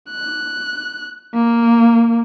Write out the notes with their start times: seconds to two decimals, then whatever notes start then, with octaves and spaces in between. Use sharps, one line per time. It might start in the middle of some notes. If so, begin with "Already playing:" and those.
0.10 F#6
1.34 A#3